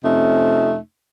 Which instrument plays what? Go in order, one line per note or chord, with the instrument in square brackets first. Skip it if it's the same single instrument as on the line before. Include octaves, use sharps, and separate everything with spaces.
[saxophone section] F2 C3 A3 C#4 D#4